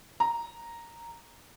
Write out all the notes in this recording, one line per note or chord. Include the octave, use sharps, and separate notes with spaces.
A#5